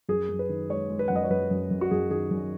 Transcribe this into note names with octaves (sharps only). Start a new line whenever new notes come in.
F#2 G#4
F#2
B4
D#3
G#3 C#5
G#3
B4
F#2 F#5
D#5
C#5
F#2 B4
F#2
F#2
F#4
F#2 G#4
D#3 G#4
F#2